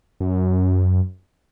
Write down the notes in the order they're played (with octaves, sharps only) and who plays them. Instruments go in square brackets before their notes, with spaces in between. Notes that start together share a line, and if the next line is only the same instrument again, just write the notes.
[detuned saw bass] F#2